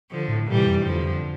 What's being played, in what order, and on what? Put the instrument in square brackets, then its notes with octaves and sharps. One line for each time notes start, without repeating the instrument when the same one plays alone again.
[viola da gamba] D3 F3
[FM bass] A2
[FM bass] A#2 [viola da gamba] E3 G3
[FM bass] C3
F2
G2
[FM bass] F2 [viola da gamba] D3 F3
[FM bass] E2
F2